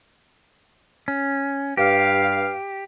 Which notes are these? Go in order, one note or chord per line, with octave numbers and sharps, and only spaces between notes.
C#4
G2 G4 F5